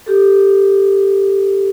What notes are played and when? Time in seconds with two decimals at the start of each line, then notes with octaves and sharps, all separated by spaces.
0.06 G4 A4